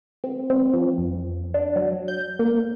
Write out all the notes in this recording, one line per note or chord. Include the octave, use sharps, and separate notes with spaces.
C4
C4
F3
F2
D4
F#3
G6
A#3